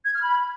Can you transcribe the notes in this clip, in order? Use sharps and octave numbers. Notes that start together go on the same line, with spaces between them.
G#6
F6
B5